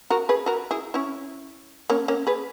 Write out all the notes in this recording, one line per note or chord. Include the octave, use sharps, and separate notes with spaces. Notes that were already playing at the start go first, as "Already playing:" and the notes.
F#4 A#4
G#4 B4
F#4 A#4
E4 G#4
C#4 E4
A#3 C#4
A#3 C#4
G#4 B4